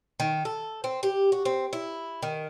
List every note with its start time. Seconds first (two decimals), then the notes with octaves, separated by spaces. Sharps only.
0.20 D#3
0.45 A4
0.84 C4
1.03 G4
1.32 F#4
1.45 C4
1.73 E4
2.23 D#3